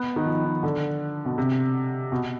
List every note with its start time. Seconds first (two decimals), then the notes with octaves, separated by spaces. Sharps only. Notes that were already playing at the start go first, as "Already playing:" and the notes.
Already playing: B3
0.16 D#3
0.26 F3
0.45 D#3
0.63 D3
1.25 B2
1.38 C3
2.12 B2